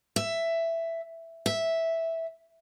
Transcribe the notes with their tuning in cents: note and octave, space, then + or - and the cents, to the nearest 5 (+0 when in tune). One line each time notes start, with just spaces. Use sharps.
E5 +10
E5 -5